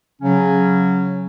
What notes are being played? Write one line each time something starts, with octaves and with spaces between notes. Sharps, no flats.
C#3 F#3 C#4